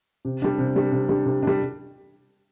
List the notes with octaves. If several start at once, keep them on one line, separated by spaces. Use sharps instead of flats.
C3
G3 D4
C3
G3 D4
C3
G3 D4
C3
G3 D4